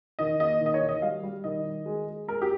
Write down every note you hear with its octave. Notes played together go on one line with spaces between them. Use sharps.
D#3 D#5
A#3 D#5
D#3
D#5
C#5
D#3
D#5
G3 F5
G3
D#3 D#5
D#3
G#3
G#3
G#3 A#4
G4